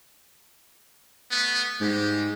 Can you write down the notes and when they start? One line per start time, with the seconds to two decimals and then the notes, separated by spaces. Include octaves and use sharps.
1.29 A3 B3
1.80 G#2 G3 G#3 G4